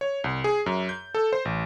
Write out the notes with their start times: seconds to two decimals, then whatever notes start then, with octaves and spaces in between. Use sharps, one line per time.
0.01 C#5
0.24 C2
0.44 G#4
0.66 F#2
0.89 G6
1.15 A4
1.33 C5
1.45 A1